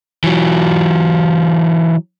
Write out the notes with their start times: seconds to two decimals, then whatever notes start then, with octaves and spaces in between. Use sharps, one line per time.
0.24 E3 F#3